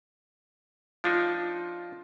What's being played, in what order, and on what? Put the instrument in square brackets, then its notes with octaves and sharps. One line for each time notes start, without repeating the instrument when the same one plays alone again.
[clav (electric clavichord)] F3 D4 D#4 [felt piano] F4